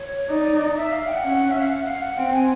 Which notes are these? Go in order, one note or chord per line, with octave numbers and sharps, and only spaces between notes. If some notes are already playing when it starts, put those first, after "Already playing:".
Already playing: C#5
D#4 D5
E5
F5
G5
F#5
C#4
E5
F5
F#5
F5
F#5
C4 G5
G#5